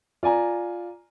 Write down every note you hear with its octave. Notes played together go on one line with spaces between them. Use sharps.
F4 D5 G#5 A#5